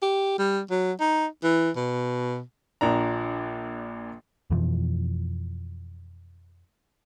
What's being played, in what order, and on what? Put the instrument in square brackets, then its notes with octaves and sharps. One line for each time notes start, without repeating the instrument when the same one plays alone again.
[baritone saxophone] G4
G3
F#3
D#4
E3
B2
[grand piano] A#1 A#2 D4 A#5
[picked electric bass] F2 B2 E3 F3